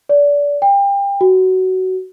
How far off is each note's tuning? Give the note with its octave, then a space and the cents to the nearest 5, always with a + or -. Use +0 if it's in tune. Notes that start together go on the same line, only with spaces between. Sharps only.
D5 -25
G5 +30
F#4 +15